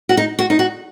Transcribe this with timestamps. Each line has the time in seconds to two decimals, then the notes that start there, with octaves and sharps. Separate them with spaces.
0.09 F#4
0.17 D#4
0.39 F#4
0.50 D#4
0.59 F#4